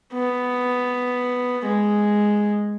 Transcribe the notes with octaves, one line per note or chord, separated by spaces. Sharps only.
B3
G#3